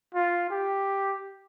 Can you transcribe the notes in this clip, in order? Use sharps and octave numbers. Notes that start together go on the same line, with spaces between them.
F4
G4